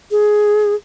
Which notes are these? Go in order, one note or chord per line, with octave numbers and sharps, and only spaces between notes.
G#4